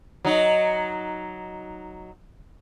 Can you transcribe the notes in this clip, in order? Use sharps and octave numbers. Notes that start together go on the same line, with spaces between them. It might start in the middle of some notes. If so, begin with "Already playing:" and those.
F#3 D#4